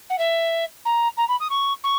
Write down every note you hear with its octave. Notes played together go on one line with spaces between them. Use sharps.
F#5
E5
A#5
A#5
B5
D#6
C#6
C#6